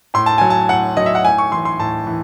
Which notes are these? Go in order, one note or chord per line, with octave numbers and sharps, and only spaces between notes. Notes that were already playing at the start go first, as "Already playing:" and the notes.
A2 C6
A5
F#3 G#5
A5
A2 F#5
F#3 D#5
E5
F#5
A2 G#5
C#6
E3 C6
C6
A2 A5
E3